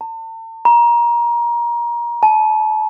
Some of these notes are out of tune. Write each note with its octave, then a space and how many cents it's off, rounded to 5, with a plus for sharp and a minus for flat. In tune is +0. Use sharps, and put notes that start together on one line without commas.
A5 +40
A#5 +25
A5 -30